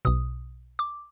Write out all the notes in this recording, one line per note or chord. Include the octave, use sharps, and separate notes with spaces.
B1 B2 D#6
D6